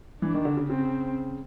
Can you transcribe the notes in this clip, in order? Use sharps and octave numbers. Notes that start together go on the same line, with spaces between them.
E3 D4
D#3
D3
C#3
C#3 C4